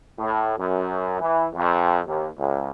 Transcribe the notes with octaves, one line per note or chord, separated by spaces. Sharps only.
A2
F#2
E3
F2
D#2
C#2